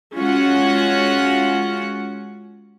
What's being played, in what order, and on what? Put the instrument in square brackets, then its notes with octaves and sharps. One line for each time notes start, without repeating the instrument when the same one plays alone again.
[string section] G#3 C#4 F4 F#4 F#5